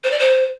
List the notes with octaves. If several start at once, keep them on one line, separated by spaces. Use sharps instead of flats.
C5
D5
C5